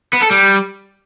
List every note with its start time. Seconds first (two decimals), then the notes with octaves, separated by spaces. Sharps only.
0.13 B3
0.22 A4
0.31 G3